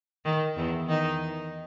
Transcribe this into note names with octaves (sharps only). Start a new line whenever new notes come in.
D#3
E2 E3
D#3 D#4